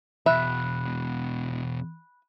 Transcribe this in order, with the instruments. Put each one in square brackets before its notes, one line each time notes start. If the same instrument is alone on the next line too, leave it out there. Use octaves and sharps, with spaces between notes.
[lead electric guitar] E2 B2 [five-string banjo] E5 [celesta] B5 F#6